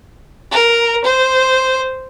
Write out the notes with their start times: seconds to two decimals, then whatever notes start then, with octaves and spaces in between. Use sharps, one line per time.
0.51 A#4
1.04 C5